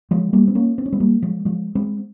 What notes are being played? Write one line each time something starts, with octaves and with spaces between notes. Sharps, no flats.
F3 G#3
G3 A#3
C4
A#3 C#4
C4
C#4
G#3 C4
G3 A#3
F3 G#3
F3 G#3
G#3 C4